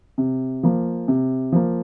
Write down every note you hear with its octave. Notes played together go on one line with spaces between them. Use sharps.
C3
F3 A#3
C3
F3 A#3